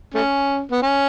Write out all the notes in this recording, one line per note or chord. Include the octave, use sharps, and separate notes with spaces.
A3 C#4
B3
C#4